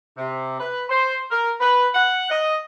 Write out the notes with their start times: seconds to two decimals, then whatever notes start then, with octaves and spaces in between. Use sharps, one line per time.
0.17 C3
0.59 B4
0.89 C5
1.30 A#4
1.60 B4
1.94 F#5
2.30 D#5